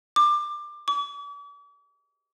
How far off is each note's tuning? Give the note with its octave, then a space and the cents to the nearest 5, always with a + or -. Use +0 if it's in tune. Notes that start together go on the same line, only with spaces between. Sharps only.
D6 +20
D6 -45